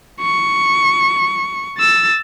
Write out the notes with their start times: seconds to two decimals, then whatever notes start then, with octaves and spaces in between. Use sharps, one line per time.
0.22 C#6
1.78 E6 A6